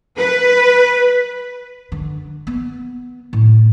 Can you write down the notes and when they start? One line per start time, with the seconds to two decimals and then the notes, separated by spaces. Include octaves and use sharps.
0.19 B4
1.92 D3
2.47 B3
3.33 A2